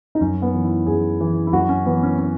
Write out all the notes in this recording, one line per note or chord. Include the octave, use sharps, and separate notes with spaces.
D#4
F#2 C#4
B3
E3
E4
F#2 G#4
E3
E4
F#2 F#4
C#4
E3 B3
C#4
C#4